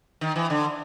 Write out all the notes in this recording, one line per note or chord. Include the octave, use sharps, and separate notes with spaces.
D#3
E3
D3